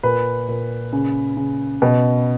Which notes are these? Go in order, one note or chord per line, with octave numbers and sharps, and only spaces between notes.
A#2 B4
A#2
C#3
C#3
B2